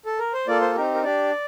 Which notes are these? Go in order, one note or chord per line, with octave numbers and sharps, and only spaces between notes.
A4
A#4
C5
A#3 F4 A4 D5
C5
C4 D#4 G4 A#4
A#4
D4 G4 D5